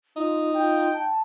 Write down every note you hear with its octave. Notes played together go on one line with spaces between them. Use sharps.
D#4 F4
F4 G5
A5